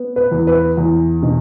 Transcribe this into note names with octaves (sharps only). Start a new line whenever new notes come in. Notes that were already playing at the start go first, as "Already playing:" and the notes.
Already playing: B3
B4
E2
B4
E2
B2